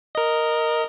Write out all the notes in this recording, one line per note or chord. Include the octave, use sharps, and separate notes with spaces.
A#4 D#5